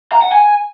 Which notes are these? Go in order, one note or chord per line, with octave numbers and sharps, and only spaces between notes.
A#5
F#5
G#5